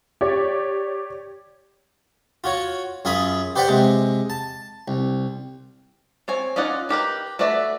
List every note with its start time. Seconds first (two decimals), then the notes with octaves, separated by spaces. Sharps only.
0.21 G4 C#5 D5
2.44 F4 F#4 C#5
3.05 F#2 F4 G#4 B5 D#6
3.56 G4 B4 C5 D5 F#5 G5
3.68 C3 G#3
4.30 A5
4.88 C2
6.28 C4 C#5 G#5
6.56 C#4 D#4 F4 D5 F#5
6.89 D#4 G4 A#4 B4
7.39 A3 F#4 B4 D5 E5